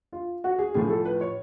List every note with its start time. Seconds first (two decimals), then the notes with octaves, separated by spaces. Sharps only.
0.13 F4
0.44 F#4
0.59 G#4
0.74 A2 F3 G#4
0.90 A4
1.05 B4
1.21 C#5